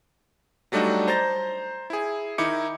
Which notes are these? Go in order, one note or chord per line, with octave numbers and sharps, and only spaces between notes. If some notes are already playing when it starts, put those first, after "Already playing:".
F#3 G3 A3 D4 D#4 F#4
C5 A#5 G6 A6 A#6
E4 G#4
D#3 D#4 E4 D6 C#7